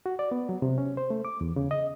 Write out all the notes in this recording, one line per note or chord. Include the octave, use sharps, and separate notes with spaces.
F#4
D5
B3
F#3
C3
C#4
C5
A3
D6
E2
C#3
D#5